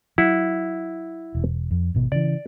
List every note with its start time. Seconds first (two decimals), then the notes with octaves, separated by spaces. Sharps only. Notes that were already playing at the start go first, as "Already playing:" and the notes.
0.18 F#3 E4 F#5
1.35 E1
1.71 F2
1.94 G#1 B2 B3
2.12 C#3 E3 D5